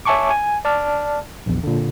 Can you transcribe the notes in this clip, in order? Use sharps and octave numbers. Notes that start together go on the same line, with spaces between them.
C#5 E5 G#5 A5 C#6 D6
G#5
D5 A5 F6
A#1 E2
A#2 D3